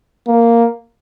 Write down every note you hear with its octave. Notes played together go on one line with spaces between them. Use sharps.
A#3